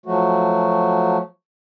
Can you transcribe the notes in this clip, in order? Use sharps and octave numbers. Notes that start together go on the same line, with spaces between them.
F3 F#3 A3 F#4